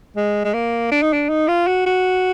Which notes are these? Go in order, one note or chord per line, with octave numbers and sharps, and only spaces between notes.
G#3
G#3
A#3
D4
D#4
D4
D#4
F4
F#4
F#4